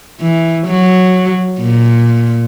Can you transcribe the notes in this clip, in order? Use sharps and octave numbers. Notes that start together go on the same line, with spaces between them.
E3
F#3
A#2